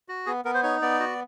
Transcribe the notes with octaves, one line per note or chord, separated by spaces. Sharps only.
F#4
B3 G#4
B3 A#4
C5
D#4 C#5
B3 D5
F#4